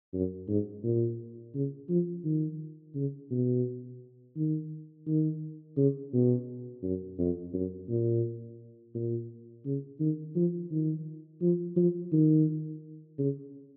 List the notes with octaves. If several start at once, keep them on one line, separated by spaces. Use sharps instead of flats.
F#2
G#2
A#2
C#3
F3
D#3
C#3
B2
D#3
D#3
C#3
B2
F#2
F2
F#2
A#2
A#2
C#3
D#3
F3
D#3
F3
F3
D#3
C#3